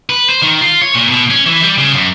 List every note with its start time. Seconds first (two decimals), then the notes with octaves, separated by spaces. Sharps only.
0.09 B4
0.29 C5
0.42 D#3
0.61 F4
0.82 C#5
0.95 A#2
1.09 B2
1.30 C#4
1.46 E3
1.63 G3
1.78 C#3
1.95 F#2